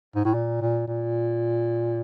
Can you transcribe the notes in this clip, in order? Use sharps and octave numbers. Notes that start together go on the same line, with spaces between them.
G#2
A2
A#2
A#2
A#2